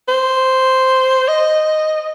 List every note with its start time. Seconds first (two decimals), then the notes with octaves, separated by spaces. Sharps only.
0.08 C5
1.28 D#5